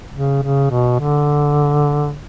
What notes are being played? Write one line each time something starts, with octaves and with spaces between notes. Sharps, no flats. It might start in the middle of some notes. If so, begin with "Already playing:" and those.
C#3
C#3
B2
D3